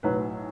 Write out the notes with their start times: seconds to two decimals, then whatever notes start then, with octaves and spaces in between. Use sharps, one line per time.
0.03 B1 A2 F#3 B4